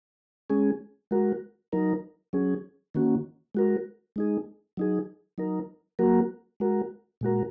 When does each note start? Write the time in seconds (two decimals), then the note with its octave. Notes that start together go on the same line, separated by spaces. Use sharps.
0.50 G#3 C#4 G#4
1.11 G#3 F#4 A#4
1.72 F#3 D#4 A#4
2.33 F#3 C#4 G#4
2.95 D#3 A#3 C#4 F#4
3.55 G#3 F#4 A#4
4.16 G#3 D#4 G#4
4.77 F#3 D#4 G#4
5.38 F#3 D#4 A#4
5.99 F#3 A#3 F#4 A#4
6.60 G#3 F#4 A#4
7.21 A#2 G#3 F#4 A#4